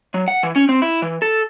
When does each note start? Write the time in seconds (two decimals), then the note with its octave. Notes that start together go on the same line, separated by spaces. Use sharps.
0.14 F#3
0.28 F#5
0.43 E3
0.56 C#4
0.69 C4
0.82 E4
1.02 E3
1.22 A4